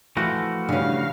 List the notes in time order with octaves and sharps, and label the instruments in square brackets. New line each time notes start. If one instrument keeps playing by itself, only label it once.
[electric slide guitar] E3 A3 F#4 [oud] F3 C4
[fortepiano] G2 [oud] C#3 C#4 [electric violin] F5